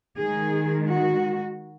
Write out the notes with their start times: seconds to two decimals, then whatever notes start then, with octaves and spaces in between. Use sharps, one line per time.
0.19 D#3 G#3 G#4
0.91 F#4